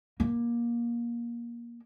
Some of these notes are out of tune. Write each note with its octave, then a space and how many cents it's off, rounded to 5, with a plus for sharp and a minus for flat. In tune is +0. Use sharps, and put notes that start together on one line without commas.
A#3 +20